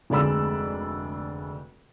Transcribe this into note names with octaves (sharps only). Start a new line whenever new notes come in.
F1 D2 G#3 D5 B5 E6